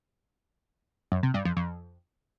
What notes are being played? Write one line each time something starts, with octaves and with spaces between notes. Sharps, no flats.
F#2
C3
G2
F2
F2